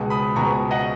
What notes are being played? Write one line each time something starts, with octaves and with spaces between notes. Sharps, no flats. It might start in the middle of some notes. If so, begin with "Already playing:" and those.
Already playing: C#2 B2 G#3
B5 D#6
C#2 B2 G#3 A#5 C#6
D#5 F#5